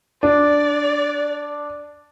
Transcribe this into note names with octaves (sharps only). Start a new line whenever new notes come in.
D4 D5